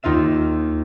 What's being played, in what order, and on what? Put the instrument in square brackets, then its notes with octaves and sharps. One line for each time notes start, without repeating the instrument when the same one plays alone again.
[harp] D#2 D#4 F4 E5 E7